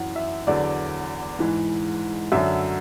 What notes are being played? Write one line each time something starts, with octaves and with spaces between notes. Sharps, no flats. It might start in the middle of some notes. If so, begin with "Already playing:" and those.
Already playing: F#2 E3 F#5
E5
E2 D3 F#3 D5
G#2 E3
F#2 D3 F#3 E5